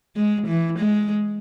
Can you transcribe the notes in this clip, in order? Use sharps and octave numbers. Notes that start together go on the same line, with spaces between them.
G#3
E3
G#3